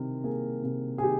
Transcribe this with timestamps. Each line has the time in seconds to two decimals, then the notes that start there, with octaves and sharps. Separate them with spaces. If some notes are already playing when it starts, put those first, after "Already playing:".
Already playing: C3 D#3 A#4
0.24 A#3 G#4
0.63 C3
0.98 G#4
1.03 D#3 G4